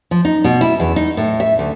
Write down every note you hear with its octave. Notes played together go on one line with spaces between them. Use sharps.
F3
D#4
B2
E4
E2
D#4
A2
E5
D2